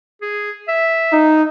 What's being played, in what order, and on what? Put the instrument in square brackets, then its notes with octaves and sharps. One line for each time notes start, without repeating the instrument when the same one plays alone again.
[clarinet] G#4
E5
[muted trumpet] D#4